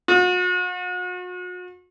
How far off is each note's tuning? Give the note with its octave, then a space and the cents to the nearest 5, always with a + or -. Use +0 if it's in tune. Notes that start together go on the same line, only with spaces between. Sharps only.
F#4 -40